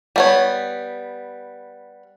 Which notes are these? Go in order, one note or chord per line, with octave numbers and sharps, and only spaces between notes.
G3 B3 C#5